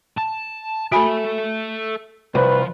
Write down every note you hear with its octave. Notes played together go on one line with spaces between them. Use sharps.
A5
F#4 A4 E5 G#5 B5
C2 F3 B4